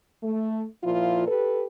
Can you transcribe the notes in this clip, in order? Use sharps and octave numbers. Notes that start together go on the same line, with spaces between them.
A3
A#2 F3 E4 F4
G4 A4 B4